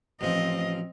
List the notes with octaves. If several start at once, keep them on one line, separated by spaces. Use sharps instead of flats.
A1 F3 C4 D#5